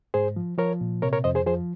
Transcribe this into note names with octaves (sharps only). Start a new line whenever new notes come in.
G#2 G#4 C5
F3
F3 A#4 C#5
A#2
C3 A#4 C#5
A#4 C#5
F2 C5 D#5
G#4 C5
F3 G#4 C5